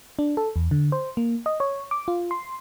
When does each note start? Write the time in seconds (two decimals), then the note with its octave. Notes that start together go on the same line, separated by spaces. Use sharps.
0.19 D4
0.37 A4
0.56 E2
0.71 D3
0.92 C5
1.17 A#3
1.46 D#5
1.60 C#5
1.91 D6
2.08 F4
2.31 C6